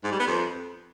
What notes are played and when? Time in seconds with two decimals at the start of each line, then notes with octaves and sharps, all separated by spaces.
0.04 G#2
0.12 G3
0.20 B3
0.27 F2